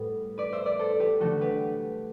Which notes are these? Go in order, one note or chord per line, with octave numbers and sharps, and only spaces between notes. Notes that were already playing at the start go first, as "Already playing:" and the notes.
Already playing: A2 G3 B3
B4 D5
C5 E5
B4 D5
A4 C5
G4 B4
D3 F#3 A3 F#4 A4
G4 B4